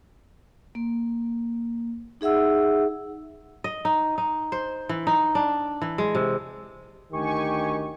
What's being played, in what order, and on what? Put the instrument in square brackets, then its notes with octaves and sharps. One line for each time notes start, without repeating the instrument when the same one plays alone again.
[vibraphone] A#3
D#4 G#4 E5 F#5 E6
[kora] D#5
D#4
D#4
C5
E3
D#4
D4
E3
G#3
C3
[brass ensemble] D2 D#3 G4 [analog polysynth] G#5 C#6